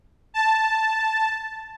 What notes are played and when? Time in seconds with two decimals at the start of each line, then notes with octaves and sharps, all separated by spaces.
0.34 A5